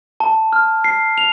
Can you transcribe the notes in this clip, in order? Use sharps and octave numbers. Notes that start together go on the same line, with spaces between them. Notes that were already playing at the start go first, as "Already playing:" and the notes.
A5
F6
C7
F7